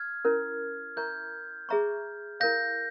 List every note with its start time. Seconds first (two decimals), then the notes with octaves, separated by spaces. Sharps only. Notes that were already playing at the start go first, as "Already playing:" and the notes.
Already playing: F6 G#6
0.25 C#4 E4 A#4
0.96 E4 A#4 E5 A#5 C#6 G6
1.69 G#4 E5 A#5 C#6
2.40 E4 A#4 F5 G6 A#6